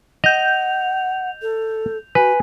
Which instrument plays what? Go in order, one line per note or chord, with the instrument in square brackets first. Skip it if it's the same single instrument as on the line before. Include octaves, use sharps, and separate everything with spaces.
[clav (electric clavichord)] D#5 [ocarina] F#5 [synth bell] G6 F7
[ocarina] A4
[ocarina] F#4 [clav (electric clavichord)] B4 [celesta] G#5